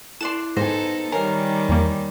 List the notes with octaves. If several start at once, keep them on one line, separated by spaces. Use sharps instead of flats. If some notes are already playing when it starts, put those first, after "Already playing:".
E4 A4 D5 C6 F#6 E7
G#2 B3 D#4 A4 C5 G#5 A#6
D#3 G3 A#4 C#5 F5 G#5 A#5
E2 A#3